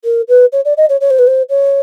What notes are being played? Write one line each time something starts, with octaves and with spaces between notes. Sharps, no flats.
A#4
B4
C#5
D5
D#5
C#5
C#5
C5
B4
C5
C#5